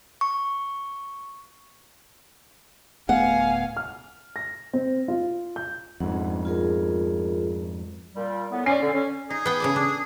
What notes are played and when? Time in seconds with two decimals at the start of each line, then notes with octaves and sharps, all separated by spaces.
0.21 C#6
3.09 D1 A3 B3 F5 F#5 G#5
3.77 F6
4.36 A#6
4.73 C4
5.08 F4
5.56 G6
6.00 F2 G#2 F#5
6.45 F4 G#4 A#4
8.16 A#2 G3
8.51 A2 B3
8.66 C#4 D5 C7
8.81 D3
8.93 C#4
9.30 D#4 G#4
9.46 B3 G5
9.60 C#3 A4 D5
9.76 D4